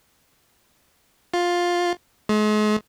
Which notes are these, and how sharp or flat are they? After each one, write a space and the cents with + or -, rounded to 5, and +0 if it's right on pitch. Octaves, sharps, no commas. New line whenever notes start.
F4 +10
G#3 +40